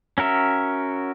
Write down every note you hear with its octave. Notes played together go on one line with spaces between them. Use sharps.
C#4 F#4 A#4 E5